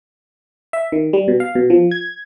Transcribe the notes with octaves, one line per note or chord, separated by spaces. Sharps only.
E5
D#3
G3
B2
F5
B2
F3
G#6